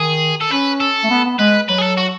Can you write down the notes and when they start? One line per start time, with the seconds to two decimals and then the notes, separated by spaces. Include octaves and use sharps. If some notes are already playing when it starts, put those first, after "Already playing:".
Already playing: D#3 G#4
0.41 A4
0.51 C#4 B4
0.80 A4
1.04 A3
1.10 B3
1.25 B3
1.39 G#3 B4
1.69 F#3 B4
1.79 G#4
1.82 A4
1.97 F#4